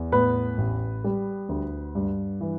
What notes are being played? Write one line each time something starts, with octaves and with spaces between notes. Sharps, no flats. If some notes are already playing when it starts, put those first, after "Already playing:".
Already playing: E2
A2 B3 B4
A1
G3
D2
G2
E3